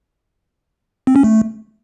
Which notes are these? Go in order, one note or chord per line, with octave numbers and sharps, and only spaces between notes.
C4
C#4
A3